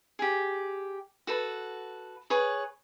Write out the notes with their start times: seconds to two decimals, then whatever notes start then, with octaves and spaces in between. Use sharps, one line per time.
0.19 G4 G#4
1.27 F#4 A4 B4
2.30 G#4 B4 C#5